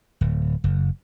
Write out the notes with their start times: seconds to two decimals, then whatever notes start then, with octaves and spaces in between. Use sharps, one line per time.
0.21 D1
0.64 F#1